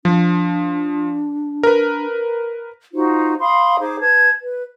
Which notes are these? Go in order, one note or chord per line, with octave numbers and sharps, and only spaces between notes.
F3 D4
A#4 B4
D#4 F4 F#4 C5
F5 B5 C6 D#6
D#4 G#4 C5 D6
B4 A5 G#6
B4